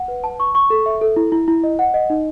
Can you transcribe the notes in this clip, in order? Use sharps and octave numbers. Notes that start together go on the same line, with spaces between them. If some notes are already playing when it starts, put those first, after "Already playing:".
Already playing: F#5
B4
A5
C#6
C#6
A4
E5
A4
E4
E4
E4
D#5
F#5
D#5
D#4